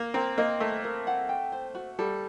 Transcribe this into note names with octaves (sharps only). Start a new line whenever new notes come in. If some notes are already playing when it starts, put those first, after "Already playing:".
Already playing: A#3
C4 A#4
A#3 D#5
A3 A#4
A#4
F#5
G5
C5
F#4
G3 A4